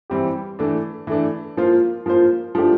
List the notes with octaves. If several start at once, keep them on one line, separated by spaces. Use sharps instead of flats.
E3 G3 C4 G4
E3 A3 D4
E3 A3 D4
F3 A#3 F4 C5
F3 A#3 F4 C5
F3 A3 D4 G4